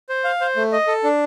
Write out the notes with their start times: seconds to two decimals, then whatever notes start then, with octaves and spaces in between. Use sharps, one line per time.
0.09 C5
0.24 F5
0.41 C5
0.56 A3
0.72 D#5
0.87 A4
1.04 D4